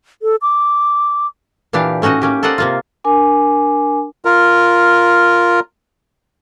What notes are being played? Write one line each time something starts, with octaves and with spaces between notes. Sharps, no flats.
A4
D6
A#2 E3 D4 G4 F5
A2 C#4 D#4 F#4 D#5
A#3 C#4 G4
A4 A#4 C5 D5 D#5 F#5
C3 A#3 F4
D4 A#4 G#5 D6
F4 A#4